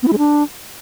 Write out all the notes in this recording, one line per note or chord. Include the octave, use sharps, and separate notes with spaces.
B3
E4
G#3
D4